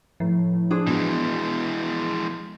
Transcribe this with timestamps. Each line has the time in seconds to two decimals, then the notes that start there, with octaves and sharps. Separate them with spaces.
0.20 A2 F3
0.70 D4 G#4 C5
0.87 B2 E3 G#3